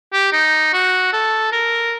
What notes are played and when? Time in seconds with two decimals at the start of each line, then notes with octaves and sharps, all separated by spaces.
0.13 G4
0.33 D#4
0.73 F#4
1.13 A4
1.52 A#4